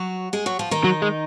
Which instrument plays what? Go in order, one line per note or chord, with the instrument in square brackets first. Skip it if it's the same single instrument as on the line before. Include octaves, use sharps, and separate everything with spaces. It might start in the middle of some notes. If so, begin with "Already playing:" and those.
Already playing: [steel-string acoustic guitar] F#3 F#4
G#3 G#4
F#3 F#4
F3 F4
D#3 D#4
[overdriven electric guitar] F#3
G#3